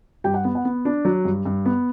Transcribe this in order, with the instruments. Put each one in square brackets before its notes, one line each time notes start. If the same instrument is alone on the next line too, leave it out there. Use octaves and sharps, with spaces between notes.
[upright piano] G2 G4 G5
F#5
B3
F#5
B3
D4
F#3
G2
G2
B3